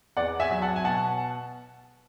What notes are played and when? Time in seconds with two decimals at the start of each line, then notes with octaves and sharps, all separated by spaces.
0.17 E2 D5 F#5
0.40 E5 G#5
0.51 F#3
0.62 F#5 A5
0.76 G#5
0.84 B2 F#5 A5